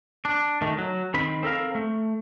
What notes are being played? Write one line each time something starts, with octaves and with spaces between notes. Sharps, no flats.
D4
D#3 A3
F#3
D#3 C4 B5
C4 A4 A#4 F5
A3